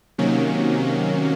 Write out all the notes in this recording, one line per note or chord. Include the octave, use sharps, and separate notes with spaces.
C3 D#3 F#3 A#3 C#4